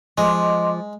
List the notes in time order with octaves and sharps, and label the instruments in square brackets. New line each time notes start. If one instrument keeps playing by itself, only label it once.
[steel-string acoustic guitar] F3 [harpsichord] G#3 [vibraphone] D#5 C6 D6